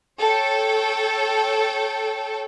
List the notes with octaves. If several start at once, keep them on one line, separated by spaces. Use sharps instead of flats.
A4 C#5 G5